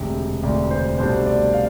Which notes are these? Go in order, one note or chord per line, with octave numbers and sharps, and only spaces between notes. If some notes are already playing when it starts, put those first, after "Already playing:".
Already playing: E1 D2 C3
E1 D2 C3 D5
C5
C2 B2 A3 D4 C5
D5
F5